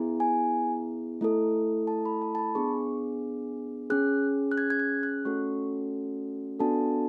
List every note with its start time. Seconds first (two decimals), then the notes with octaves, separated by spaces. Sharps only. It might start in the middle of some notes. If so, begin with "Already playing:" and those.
Already playing: B3 E4 G#4
0.20 G#5
1.21 A3 E4 A4
1.87 A5
2.05 B5
2.22 A5
2.35 A5
2.39 B5
2.55 B3 D4 G#4 C#6
3.90 C#4 G#4 F#6
4.52 F#6
4.58 G#6
4.70 G#6
4.79 F#6
5.03 F#6
5.25 A3 C#4 F#4 A4 C#6
6.60 B3 D4 F#4 A4 A5